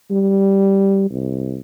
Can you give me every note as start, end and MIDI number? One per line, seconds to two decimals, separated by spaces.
0.10 1.09 55
1.11 1.59 36